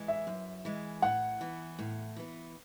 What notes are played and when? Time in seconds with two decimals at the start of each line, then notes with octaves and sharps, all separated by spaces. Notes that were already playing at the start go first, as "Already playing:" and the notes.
Already playing: E3 G#3
0.08 E5
0.27 F#2
0.65 E3 G#3
1.02 A2 F#5
1.41 E3 B3
1.79 A2
2.16 E3 B3